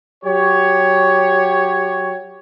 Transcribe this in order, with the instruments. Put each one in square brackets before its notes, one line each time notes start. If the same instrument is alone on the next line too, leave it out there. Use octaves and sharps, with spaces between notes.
[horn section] F#3 G4 C#5